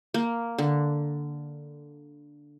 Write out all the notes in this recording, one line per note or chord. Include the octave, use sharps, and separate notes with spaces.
A#3
D3